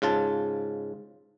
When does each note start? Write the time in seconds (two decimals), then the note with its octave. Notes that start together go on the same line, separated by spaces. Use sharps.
0.02 G#2 C#3 F4 A5